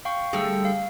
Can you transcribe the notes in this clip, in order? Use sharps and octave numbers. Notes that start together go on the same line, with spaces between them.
F5 G5 C#6
D3 G3 A3 G#4 G5 E6
F5